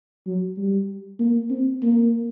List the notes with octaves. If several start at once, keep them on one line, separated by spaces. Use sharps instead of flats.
F#3
G3
A#3
C4
A#3